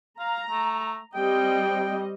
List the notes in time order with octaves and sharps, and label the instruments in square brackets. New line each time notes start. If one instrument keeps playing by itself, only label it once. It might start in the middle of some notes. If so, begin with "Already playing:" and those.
[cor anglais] F5 [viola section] A#5
[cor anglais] A3
[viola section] G3 C4 D#5 [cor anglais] G5